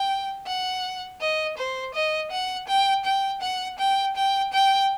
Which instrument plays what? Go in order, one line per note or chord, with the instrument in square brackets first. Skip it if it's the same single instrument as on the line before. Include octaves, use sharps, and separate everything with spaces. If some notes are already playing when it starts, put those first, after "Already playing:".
Already playing: [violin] G5
F#5
D#5
C5
D#5
F#5
G5
G5
F#5
G5
G5
G5